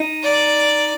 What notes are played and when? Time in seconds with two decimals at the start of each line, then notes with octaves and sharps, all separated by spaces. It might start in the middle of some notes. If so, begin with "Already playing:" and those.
Already playing: D#4
0.23 D5